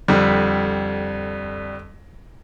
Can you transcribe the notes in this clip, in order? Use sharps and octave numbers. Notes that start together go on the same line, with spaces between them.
F2 D3 G3